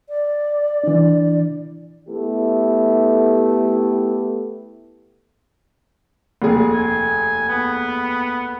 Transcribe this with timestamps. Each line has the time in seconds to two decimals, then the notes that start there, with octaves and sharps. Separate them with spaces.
0.09 D5
0.84 E3 D4
2.08 A3 B3 E4 G4
6.42 F1 D#2 G#4
6.73 G#5
7.49 B3